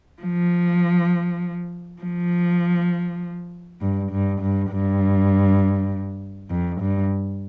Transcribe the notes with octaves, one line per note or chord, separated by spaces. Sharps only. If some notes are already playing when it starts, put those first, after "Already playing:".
F3
F3
G2
G2
G2
G2
F2
G2